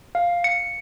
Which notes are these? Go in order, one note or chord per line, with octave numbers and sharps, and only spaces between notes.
F5
C#7